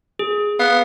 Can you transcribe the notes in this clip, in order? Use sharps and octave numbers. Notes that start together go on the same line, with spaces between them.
G#4
B3 F5